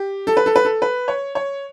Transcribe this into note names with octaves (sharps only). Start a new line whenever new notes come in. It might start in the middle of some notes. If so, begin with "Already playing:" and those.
Already playing: G4
A4
B4
A4
B4
A4
B4
C#5
C#5